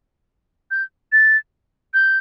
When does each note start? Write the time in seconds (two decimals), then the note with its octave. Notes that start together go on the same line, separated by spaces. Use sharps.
0.71 G6
1.12 A6
1.94 G6